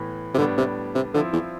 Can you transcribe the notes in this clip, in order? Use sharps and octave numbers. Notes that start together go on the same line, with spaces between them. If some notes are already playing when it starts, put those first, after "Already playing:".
Already playing: A2 E3 B3
C3
A2 D3 G3 B3 D4
C3
C3
D3 F3 C4 E4
E2